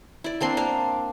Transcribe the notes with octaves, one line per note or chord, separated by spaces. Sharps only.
E4 D5
A#3 C4 D4 C6
A#3 D4 F5